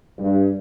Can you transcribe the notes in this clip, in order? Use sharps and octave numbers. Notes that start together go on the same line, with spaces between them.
G2